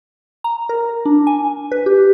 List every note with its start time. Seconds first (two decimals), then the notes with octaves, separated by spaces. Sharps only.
0.44 A#5
0.69 A#4
1.05 D4
1.27 G#5
1.72 B4
1.86 G4